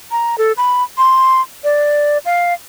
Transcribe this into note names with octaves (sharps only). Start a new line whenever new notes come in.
A#5
A4
B5
C6
D5
F5